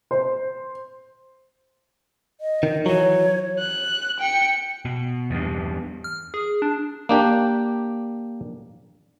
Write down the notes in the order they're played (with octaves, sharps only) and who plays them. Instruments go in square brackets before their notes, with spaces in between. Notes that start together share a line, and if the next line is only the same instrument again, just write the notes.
[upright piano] C5
[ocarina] D#5
[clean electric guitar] D#3
[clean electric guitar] E3 F#3 [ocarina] C#5
[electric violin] F#6
G5 C#7
[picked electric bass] B2
E2 G2
[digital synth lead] F6
G#4
D4
[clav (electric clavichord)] A#3 D4 G4